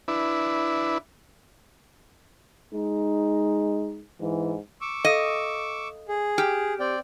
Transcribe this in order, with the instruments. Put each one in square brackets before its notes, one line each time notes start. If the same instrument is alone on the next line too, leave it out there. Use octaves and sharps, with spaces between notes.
[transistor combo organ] D4 E4 B4
[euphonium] G#3 [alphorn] D#4
[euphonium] G#2 [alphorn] E3
[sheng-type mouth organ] C#6 D6 E6
[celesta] A4 F5 D#6 [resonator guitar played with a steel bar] D#5
[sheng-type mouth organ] G#4
[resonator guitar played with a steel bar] G4 [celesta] F6
[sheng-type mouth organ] C4 D5 G5